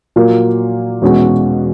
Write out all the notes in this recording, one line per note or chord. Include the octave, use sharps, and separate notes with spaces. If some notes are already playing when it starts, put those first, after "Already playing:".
A#2 F#3 A#3
E2 B2 G#3 C#4 F#4